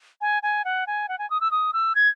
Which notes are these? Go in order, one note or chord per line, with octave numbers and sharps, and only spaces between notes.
G#5
G#5
F#5
G#5
F#5
G#5
D#6
E6
D#6
E6
G#6